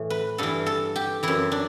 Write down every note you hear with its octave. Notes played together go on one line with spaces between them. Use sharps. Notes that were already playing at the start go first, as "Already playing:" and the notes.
Already playing: A2 E3
B4
G2 E3 A4
A4
G4
F#2 E3 E4
D4